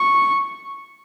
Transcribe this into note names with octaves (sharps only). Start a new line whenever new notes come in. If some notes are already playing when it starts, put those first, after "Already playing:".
Already playing: C#6